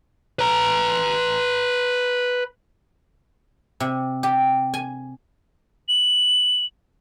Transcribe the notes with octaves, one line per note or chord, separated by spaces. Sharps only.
B4 A#5
C3
G4
G#5
F#7